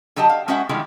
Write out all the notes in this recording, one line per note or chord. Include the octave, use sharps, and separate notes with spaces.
D3 F#3 G4 D#5 A5
F5
G#3 C#4 F#4 C5 E5 F#5
D3 D#3 F3 G3 G#3 E4